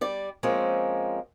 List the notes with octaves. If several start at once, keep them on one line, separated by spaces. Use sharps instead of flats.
G3 D5
F3 G#3 A#3 C4 C#4